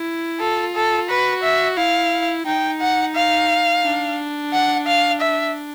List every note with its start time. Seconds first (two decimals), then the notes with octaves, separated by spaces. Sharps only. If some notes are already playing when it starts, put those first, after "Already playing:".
Already playing: E4
0.40 F4 A4
0.75 A4
1.09 F#4 B4
1.44 E5
1.77 E4 F5
2.46 D#4 G5
2.81 F#5
3.16 F5
3.84 D4
4.53 F#5
4.87 F5
5.21 E5